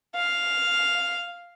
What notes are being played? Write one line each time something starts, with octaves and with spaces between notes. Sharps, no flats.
F5